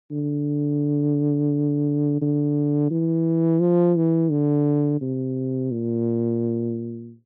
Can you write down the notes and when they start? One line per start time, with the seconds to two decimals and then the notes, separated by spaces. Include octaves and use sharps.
0.11 D3
2.22 D3
2.91 E3
3.61 F3
3.96 E3
4.31 D3
5.01 C3
5.71 A#2